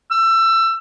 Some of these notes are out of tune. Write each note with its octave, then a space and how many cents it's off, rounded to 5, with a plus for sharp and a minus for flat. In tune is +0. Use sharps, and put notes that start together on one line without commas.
E6 +25